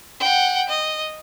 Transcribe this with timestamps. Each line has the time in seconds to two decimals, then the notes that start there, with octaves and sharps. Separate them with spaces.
0.20 F#5 G5
0.69 D#5